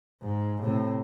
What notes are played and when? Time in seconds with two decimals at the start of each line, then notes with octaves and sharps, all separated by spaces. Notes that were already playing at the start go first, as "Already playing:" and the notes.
0.23 G#2
0.63 A2 C3